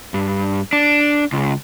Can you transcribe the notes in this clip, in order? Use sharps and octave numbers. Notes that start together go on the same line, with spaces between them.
G2
D4
C#2